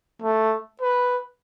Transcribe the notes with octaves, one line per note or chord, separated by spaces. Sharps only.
A3
B4